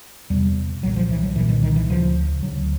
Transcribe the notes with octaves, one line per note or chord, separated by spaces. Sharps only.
E2 C3 G3
C2 A#2 F#3
F3
E3
F#3
C2 A#2 E3
D#3
D#3
E3
D2 C#3 F3
D2 C#3 F#3